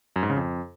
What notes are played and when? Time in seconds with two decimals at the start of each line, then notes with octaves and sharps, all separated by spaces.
0.16 F#2
0.23 G#2
0.30 C#3
0.37 F2